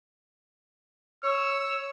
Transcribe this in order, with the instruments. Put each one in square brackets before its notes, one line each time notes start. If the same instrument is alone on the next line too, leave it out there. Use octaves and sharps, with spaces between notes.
[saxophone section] C#5 [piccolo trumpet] E6